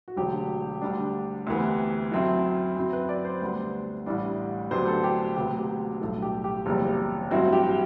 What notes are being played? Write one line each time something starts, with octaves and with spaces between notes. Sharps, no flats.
F#4
E1 D2 D3 F#3 G4
D2 D3 G3 D4
D2 C3 E3 B3
F#2 F#3 A3 C4 E4
F#2 F#3 C4 E4
B4
D5
C5
D2 D3 G3 B3 D4
A1 A2 G3 D4
D2 C3 F#3 B3 D4 C5
A4
G4
E1 D2 C3 F#3 B3 G4
G4
B1 A2 G3 D4 A4
G4
G4
F#1 E2 C3 G3
A1 G2 F#3 C4 E4 F#4
G4